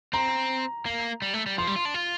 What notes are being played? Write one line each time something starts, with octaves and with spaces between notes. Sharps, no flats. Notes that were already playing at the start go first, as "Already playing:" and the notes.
C4 A#5
A#3
G3
A3
G3
F3 C6
G3
F4
D4
F4